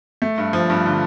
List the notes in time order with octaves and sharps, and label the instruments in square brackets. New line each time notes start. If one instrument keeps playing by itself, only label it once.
[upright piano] A3
G2
F3
G2
D3